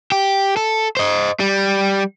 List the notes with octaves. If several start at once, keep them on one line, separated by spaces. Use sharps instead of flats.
G4
A4
C5 D#5
G3